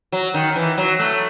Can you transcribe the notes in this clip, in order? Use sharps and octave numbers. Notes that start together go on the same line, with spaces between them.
F#3
D#3
E3
F#3
A3